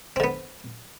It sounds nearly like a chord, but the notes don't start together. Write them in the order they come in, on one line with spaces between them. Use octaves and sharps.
C4 D3 B3